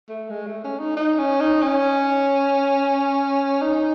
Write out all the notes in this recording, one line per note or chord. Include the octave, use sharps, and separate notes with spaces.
A3
G#3
A3
C#4
D#4
D#4
C#4
D#4
C#4
D#4